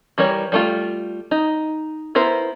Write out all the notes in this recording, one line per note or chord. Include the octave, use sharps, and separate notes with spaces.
E3 G3 A#4 C#5
G3 A3 F4
D#4
B3 E4 A#4 C5